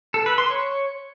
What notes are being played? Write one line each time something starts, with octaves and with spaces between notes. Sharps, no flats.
A4
B4
C6
C#5